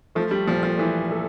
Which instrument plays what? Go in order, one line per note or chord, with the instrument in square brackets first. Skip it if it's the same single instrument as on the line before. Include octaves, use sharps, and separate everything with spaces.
[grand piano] F3 [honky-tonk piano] A3
[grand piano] G3
[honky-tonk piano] A#2 [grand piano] F3
[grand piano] F3
[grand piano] E3 [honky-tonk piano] A3
[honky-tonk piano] A4